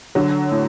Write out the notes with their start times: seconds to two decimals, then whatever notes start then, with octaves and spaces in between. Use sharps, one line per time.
0.15 D3 F#3
0.51 A2